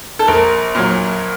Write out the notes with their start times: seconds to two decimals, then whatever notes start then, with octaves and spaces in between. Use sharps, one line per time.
0.19 A4
0.27 A#1 A#4
0.75 A#2 F#3